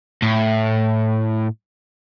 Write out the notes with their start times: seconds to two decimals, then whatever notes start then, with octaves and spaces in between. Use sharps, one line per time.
0.22 A2